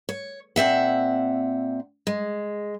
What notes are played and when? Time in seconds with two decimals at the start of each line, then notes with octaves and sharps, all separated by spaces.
0.09 C#5
0.56 A#2 C4 E5 F#5
2.07 G#3